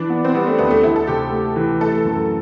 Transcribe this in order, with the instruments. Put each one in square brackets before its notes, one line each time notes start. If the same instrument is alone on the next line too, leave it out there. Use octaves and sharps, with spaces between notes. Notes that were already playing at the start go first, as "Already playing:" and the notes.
Already playing: [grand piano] E3 [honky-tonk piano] D4
[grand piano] B3
[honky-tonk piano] C4
[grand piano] G3 [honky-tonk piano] B3
[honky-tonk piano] A3
[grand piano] D2 [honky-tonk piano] B3
[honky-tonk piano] A3
[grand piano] D2 [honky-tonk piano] E4
[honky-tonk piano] A4
[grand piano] C3 [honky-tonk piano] G4
[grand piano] A3
E3
[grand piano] A3 [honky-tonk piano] A4
[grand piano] F#2